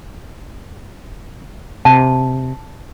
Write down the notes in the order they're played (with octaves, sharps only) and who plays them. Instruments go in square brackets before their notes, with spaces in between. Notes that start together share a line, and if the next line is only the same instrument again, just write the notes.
[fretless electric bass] C3 [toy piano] A5